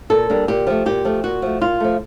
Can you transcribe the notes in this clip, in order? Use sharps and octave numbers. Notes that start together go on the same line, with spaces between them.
A#2 A4
G3 A#3 D4
A#2 G4
F3 A3
A#2 G4
F3 A3
A#2 F#4
F3 A3
A#2 F4
F3 A3